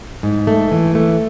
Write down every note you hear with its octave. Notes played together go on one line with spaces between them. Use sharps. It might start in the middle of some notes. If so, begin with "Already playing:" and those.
G#2
A3
E3
A3